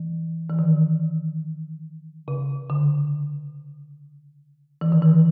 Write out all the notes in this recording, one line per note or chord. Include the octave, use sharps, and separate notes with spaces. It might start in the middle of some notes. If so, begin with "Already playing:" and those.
Already playing: E3
E3
D#3
C#3
D3
E3
D#3
E3